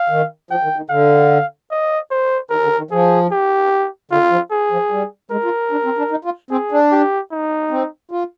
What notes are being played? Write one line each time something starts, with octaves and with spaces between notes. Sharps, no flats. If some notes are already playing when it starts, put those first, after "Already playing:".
Already playing: F5
D#3
F3 G5
D#3
D#3
D3 F5
D#5
C5
D#3 A#4
D3
D#3
F3 G#4
G4
D3 F4
F3
G#4
F3
G3
G#3 A#4
F4
D4
C4
D4
D#4
F4
C4 G#4
D4
G4
D#4
C4
F4